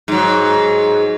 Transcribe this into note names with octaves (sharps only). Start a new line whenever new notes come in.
G#2 F#3